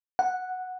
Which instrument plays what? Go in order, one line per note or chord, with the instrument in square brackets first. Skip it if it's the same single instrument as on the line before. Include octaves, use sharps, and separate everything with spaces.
[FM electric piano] F#5